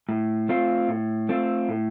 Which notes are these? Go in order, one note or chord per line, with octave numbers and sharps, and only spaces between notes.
A2
A3 C4 F4
A2
A3 C4 F4
A2